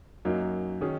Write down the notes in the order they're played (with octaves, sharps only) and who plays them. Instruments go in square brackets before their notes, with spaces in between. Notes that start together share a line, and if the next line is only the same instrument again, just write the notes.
[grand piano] F#2 F#3 A#3 D#4
D#3 F#3 C#4 G#4